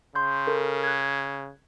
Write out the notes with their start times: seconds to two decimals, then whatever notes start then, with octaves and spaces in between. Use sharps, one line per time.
0.15 C#3 C6 G6
0.47 A4 A#4
0.84 F#6 G#6